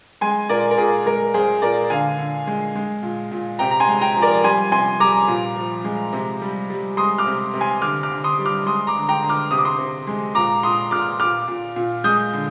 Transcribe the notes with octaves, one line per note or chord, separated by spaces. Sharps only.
G#3 G#5 C6
A#2 A#4 D5
A#4
A#2 G#4
G#3 A#4
G#3 G#4 C5
A#2 A#4 D5
D3 F5 G#5
D3
G#3
G#3
A#2
A#2
C3 G5 A#5
A#5
G#5 C6
G#3
G5 A#5
F3
A#4 D5
G3 G#5 C6
C3 G#5 C6
G3 A#5 D6
A#2
F3
G#3
C3
G3
G3
G#3 C6 D#6
D6 F6
C3
C3
G#5 C6
D3 D6 F6
D6 F6
D3
C6 D#6
G3
D6 F6
G#3 C6 D#6
A#5 D6
D3
G5 A#5
D3
D6 F6
C3 D#6
D6
C6 D#6
C3
G#3
A#2 A#5 D6
A#2 C6 D#6
A#2 D6 F6
A#2 D6 F6
A#2
A#2
G#3 D#6 G6
D3